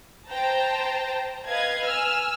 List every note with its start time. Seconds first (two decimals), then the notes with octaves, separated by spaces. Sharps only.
0.29 C5 G5 A5 A#5
1.46 B4 D#5 F5 G#6
1.85 G#5 E6 F6